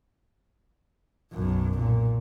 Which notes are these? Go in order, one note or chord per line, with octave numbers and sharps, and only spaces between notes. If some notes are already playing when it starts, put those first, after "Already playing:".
B1 F#2
A#2